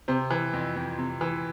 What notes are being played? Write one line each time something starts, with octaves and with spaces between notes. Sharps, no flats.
C3 C5
E3
F2
F2
C3
E3